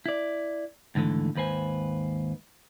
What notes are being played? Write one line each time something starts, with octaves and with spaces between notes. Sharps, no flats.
E4 D5
D#2 G#2 D3 E3 A3
D#2 G#2 B4 C5 G#5